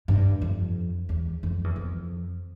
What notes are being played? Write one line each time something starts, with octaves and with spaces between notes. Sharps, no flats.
G2
F2
E2
F2
E2
F2